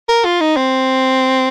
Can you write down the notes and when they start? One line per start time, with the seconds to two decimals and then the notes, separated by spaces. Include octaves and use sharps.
0.09 A#4
0.25 F4
0.40 D#4
0.56 C4